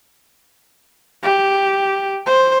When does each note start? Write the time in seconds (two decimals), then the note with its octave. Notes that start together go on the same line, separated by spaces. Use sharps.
1.23 G4
2.26 C5